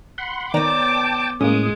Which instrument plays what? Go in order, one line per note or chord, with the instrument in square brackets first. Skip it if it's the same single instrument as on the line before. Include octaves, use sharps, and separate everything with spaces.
[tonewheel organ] F#5 B5 C6
[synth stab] D#3 D5 A#5 [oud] B3 C#5 [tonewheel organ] G5 A5 [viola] D6
[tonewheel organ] A2 D#6 [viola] G#3 [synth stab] A#3 C#4